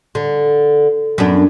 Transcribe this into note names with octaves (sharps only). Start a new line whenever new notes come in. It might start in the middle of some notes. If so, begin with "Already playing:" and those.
D3
F#2 B3 D4